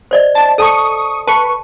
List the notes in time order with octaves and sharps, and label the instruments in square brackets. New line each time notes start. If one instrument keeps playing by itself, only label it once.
[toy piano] C5 D5 D#5
[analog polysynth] A5
[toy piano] A4 A5 [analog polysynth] C#6 D#6
[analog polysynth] B4 C#6 [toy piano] A5